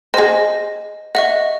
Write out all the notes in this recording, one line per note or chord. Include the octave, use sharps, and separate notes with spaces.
G#4 C5 D#5 A#6
D#5 E5 F#5 C#6